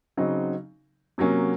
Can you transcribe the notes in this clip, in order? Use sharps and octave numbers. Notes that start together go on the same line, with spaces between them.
C#3 F#3 C4 D#4
C3 F#3 A#3 C#4